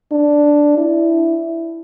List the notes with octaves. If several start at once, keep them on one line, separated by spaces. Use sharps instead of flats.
D4
E4